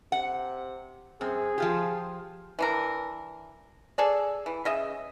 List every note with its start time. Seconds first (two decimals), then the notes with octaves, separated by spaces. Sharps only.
0.12 C3 F#5
1.21 F#2 C4 G#4
1.58 F3 F4 G4
2.59 E3 D4 A#4
3.98 G#4 A4 D5
4.46 E3
4.65 C#3 D#5 E5